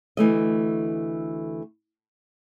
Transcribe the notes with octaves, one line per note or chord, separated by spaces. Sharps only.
D2 E3 A3 D#5